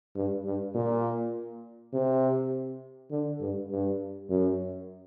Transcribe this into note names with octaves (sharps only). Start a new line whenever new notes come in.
G2
G2
A#2
C3
D3
G2
G2
F#2